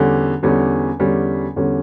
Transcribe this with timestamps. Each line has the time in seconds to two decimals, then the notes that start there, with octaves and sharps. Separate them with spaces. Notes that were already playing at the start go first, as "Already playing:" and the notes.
Already playing: E2 D3 G3 C#4
0.43 E2 D3 G3 C#4
1.00 E2 D3 G3 C#4
1.56 E2 D3 G3 C#4